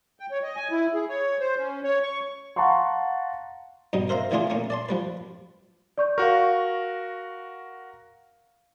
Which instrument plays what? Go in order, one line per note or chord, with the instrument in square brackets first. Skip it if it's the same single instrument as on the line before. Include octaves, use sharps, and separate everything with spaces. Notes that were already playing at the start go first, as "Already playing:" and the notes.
[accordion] G5
C#5
D#5
G#5
E4
G#4
C#5
C5
C#4
C#5
C#6
[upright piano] F5 F#5 A5 A#5 C6 C#6
[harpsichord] G2 B2 G3 D#4
A#4 C5 E5 F5 A#5
D3 E3 A3 D4 F4 G#4
A3 A#3 C#4
D5 A5 C6
F3 G3 B4
[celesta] D5 C#6 G6
[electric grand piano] F#4 A#4 [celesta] F5 C#6